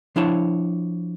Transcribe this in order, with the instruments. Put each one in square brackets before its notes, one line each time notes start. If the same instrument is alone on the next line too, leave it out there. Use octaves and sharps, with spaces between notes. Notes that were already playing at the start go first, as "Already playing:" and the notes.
[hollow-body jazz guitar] F3 D4 E4 C#5 A5